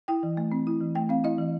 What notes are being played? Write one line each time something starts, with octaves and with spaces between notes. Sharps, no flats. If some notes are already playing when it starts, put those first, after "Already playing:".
E4 G5
E3
A3
C4
E4
E3
A3 G5
C4 F5
E4 D#5
E3